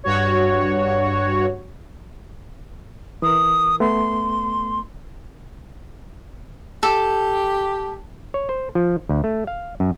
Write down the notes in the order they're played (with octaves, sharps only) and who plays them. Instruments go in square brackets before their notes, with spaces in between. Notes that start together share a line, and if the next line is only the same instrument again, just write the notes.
[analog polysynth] G2 F#4 C#5
[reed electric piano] E3 A#4 [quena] D#6
[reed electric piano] A3 B3 [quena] C6
[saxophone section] G4 [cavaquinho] A4
[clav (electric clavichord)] C#5
C5
F3
D2
A3
F5
F#2